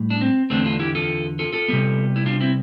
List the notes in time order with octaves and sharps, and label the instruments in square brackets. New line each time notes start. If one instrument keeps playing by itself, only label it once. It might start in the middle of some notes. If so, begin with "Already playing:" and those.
Already playing: [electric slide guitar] A2 G3
D4
C4
E2 D3 A3 C4 D4
D4 F4
E4 G4
F4 A4
F4 A4
F4 A4
C3 G3 B3
E4
D4 F4
C4 E4